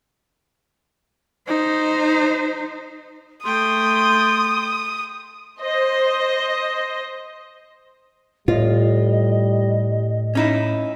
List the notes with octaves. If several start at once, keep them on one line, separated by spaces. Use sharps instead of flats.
D#4 C5
A3 G5 C6 D#6
C5 D#5
A2 G3 F4 D#5
C#4 D#4 E4